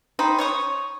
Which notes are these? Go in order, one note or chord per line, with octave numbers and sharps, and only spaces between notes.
D#4 C5 G5 B5
C#5 C#6 D#6